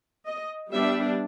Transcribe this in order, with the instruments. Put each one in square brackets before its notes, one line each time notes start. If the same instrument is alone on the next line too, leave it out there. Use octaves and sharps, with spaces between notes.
[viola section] D#5
G3 B3 D4 E5